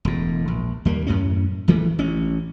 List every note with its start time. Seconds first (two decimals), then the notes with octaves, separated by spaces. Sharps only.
0.05 E1 A2
0.48 A#1
0.85 D#2 G3 A#3
1.07 F#2 A2 C#4
1.68 A#1 E3 G#3 A3
1.99 A1 C#4